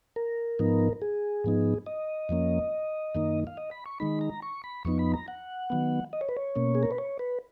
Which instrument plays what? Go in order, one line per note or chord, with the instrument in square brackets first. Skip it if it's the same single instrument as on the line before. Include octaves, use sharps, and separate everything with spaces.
[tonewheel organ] A#4
G#2 F3 B3 D#4
G#4
G#2 F3 B3 D#4
D#5
F2 F3 A#3 C#4
F#2 D#3 A#3 D#4
F5
D#5
B5
C#6
D#3 G#3 D#4 B5
A#5
C#6
B5
F2 F3 B3 D#4 C#6
B5
A#5
F#5
D#3 F#3 B3
D#5
C#5
B4
C#5
B2 A#3 C#4
G#4
A#4
B4
C#5
B4